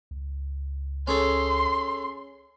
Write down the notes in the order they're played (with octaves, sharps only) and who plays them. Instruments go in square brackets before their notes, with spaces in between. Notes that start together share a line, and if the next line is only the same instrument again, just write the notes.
[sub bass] C#2
[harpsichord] C#4 G#4 A4 [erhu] C6